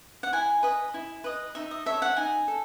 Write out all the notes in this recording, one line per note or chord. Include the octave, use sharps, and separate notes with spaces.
F#5
E4 G#5
B4 D#5
E4
B4 D#5
D#4 E5
D#5
A4 C#5 E5
F#5
D#4 G#5
A4